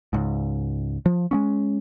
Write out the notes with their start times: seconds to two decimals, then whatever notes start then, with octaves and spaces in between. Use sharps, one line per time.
0.13 C#2 G#2
1.06 F3
1.31 G#3 B3 C#4